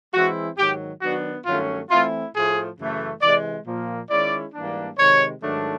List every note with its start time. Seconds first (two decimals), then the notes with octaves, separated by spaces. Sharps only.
0.14 E3 G#3 C4 E4 F#4
0.58 G#2 D#3 F#3 G4
1.02 D#3 F#3 B3 D4 F#4
1.46 G2 D#3 F#3 A3 C#4 F4
1.90 E3 A3 C4 E4 F4
2.34 A2 F3 A3 G#4
2.78 F#2 C#3 E3 A3
3.22 C3 E3 G#3 D5
3.66 A#2 F3 A#3
4.10 D#3 G#3 C#4 E4 D5
4.54 G#2 E3 G3 A#3 D4
4.98 C3 D#3 G#3 C#5
5.42 G#2 D#3 F#3 A3 D4